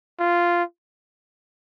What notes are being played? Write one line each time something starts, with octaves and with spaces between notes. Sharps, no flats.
F4